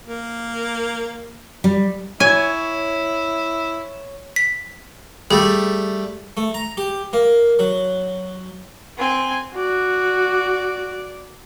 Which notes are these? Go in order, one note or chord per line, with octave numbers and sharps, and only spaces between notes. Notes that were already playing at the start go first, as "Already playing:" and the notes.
A#3
G3
E4 C#5 G#5
B6
G3 A3 G#4
A3
A#5
G4
A#3
F#3
C4 G#5
F#4 D5